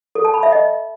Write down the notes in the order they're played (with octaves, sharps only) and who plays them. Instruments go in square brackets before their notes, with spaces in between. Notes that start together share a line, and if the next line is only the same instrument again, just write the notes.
[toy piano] A4
A5
B5
E5
D#5